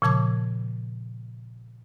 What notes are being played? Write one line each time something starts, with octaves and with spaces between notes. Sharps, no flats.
A#2 C#3 F3 A5 D6 G#6